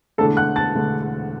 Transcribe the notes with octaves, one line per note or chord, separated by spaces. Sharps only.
E1 E2 D3 A3 D4 A4 A5
F#5 F#6
A5 A6
E1 E2 D3 A3 D4